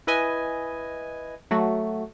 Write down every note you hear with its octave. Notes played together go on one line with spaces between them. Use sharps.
E4 B4 D#5 G#5
F#3 A3 F#4